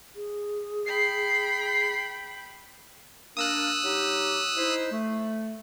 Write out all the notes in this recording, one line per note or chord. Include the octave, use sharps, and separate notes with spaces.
G#4
G5 B5 C7
A#3 D4 A#4 D#6 E6 F#6
F#3 D#4 G4
D#4 E4 C5
A3